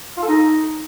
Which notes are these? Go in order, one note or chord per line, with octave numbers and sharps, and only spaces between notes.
F4
A4
D#4